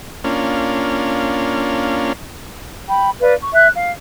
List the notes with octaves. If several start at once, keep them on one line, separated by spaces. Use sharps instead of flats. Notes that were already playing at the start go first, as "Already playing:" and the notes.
A#3 C#4 D4 F4
G5 B5
B4 D5 F5
C#6
E5 F#6
F5